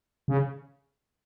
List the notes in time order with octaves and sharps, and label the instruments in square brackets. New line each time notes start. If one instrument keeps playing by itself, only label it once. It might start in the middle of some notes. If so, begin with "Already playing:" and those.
[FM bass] C#3